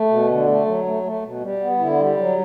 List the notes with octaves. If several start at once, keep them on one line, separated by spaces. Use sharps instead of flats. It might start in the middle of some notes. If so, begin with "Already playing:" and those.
Already playing: A3
B2
D3
A3
F#3
A3
A3
B2
G3
B3
D3 E4
G3
F#3